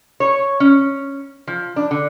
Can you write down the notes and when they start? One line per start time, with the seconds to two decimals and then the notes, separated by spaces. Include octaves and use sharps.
0.20 C#5
0.60 C#4
1.47 F3
1.76 D4
1.91 D3